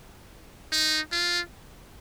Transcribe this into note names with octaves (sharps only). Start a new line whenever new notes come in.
D#4
F4